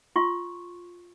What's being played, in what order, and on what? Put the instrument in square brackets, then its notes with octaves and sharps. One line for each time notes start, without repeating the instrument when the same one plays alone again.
[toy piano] F4 C6 C#6